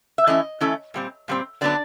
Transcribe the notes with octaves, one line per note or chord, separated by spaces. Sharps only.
E5
E3 A3 C#4 E4 D#5
E3 A3 C#4 E4
A#2 G3 C4
A#2 G3 C4
D3 F#3 B3 D4 D5